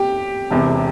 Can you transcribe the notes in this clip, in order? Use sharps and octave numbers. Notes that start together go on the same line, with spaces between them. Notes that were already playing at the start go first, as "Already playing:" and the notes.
Already playing: G4
E1 E2 C3